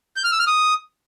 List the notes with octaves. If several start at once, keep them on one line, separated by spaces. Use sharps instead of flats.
G6
F6
E6
F6
D#6